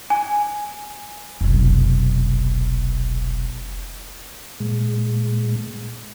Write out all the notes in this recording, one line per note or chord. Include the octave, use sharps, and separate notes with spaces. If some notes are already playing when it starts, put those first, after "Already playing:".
G#5
F1 B1
A#2 G#3